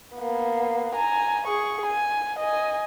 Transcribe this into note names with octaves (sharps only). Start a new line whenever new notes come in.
A#3 B3
G#5 A#5
G#4 C#6
G#5
D#5 G#5